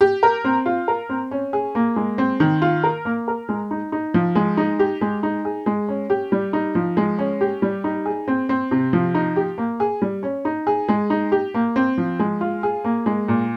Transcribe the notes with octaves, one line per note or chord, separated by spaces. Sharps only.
G4
A#4
C4
F4
A#4
C4
C#4
G#4
A#3
G#3
C4
D#3
F4
A#4
A#3
A#4
G#3
D#4
D#4
F3
G#3
D#4
G4
G#3
D#4
G#4
G#3
C#4
G4
G3
D#4
F3
G#3
C#4
G4
G3
D#4
G#4
C4
C4
C3
F3
D#4
G4
A#3
G#4
G3
C#4
D#4
G#4
G#3
D#4
G4
A#3
C4
F3
G#3
F4
G#4
A#3
G#3
A#2